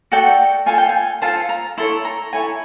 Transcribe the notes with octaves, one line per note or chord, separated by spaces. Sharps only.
F#4 A4 D5 G5
F4 A4 C5 G#5
G5
G#5
F4 A4 C5 A5
A#5
E4 A4 C#5 C6
A#5
E4 A4 C#5 G#5